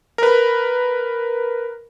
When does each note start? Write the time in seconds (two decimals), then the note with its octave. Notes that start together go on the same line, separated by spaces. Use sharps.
0.18 A#4 B4